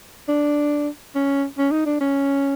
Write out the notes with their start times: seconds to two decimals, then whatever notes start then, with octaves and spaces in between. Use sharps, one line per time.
0.28 D4
1.15 C#4
1.58 C#4
1.71 D#4
1.86 D4
2.01 C#4